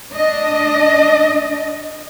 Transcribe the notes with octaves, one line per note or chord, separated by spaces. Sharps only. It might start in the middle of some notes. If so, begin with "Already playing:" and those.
D4 D#5